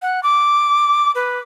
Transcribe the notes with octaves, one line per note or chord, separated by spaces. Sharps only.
F#5
D6
B4